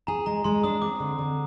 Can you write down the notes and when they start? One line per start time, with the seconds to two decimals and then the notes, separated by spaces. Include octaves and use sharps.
0.07 G#4 A#5
0.26 G#3 A#5
0.44 G#3 C6
0.64 D4 D#6
0.82 C4 D6
1.00 D3
1.19 D3